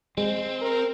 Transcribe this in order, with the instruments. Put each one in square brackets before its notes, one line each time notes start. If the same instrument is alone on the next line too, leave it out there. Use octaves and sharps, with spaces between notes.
[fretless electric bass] G#3 [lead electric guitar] C4
[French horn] A#4